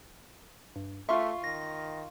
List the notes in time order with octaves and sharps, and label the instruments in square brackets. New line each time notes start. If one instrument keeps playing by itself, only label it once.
[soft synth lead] G2
[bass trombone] A3 [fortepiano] F4 C6 C#6 [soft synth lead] E5
[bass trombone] D#3 [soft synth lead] A#6